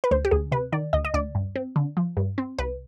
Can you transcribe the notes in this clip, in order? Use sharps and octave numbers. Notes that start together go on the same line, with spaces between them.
B4
D2 C5
G4
D2 G#4
C3 B4
D#3 D5
D2 D#5
D#5
D2 D5
G2
C4
D3
F3
G2
C4
C2 B4